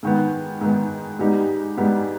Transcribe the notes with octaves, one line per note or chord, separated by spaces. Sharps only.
G#2 D#3 B3
G#2 D#3 B3
G#2 G3 B3 D#4 G4
G#2 G3 B3 D#4 G4